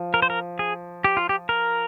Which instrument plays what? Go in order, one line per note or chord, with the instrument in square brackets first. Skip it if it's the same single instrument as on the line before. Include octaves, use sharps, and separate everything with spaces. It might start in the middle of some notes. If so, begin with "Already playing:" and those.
Already playing: [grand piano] F3
[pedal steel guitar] A#4
C5
A#4
G#4
G4
F4
G4
A#4